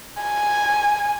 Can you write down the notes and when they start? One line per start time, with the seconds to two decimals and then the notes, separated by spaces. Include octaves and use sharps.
0.22 G#5